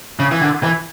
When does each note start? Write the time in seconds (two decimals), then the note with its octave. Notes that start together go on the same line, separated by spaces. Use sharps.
0.19 C#3
0.32 E3
0.41 D3
0.63 E3